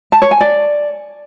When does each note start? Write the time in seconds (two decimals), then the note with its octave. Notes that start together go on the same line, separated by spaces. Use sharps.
0.12 A5
0.22 C#5
0.31 G#5
0.41 D5